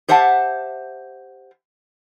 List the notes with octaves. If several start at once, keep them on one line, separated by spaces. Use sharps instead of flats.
G4 C5 E5 F#5 A5